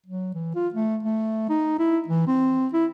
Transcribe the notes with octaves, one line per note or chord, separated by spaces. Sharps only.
F#3
E3
F4
A3
A3
D#4
E4
E3
C4
E4